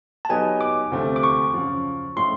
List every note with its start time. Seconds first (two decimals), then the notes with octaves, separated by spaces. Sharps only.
0.25 A5
0.29 F#3 B3 D#4 G4 G#5
0.61 D6
0.91 D2 C3 F3 A3 C4
1.16 D6
1.23 C#6
1.54 F#2 C#3 F3
2.16 A2 F3 G#3 C#4 E4 C6